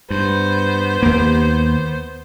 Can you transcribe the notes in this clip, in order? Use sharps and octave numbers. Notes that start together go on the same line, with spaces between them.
G2 B3 C5
D#2 A#3